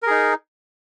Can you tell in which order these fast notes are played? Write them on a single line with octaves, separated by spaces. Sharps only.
A#4 G#4 D#4